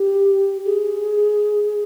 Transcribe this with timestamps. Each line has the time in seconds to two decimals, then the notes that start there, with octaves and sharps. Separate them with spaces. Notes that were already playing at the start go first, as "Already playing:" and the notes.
Already playing: G4
0.65 G#4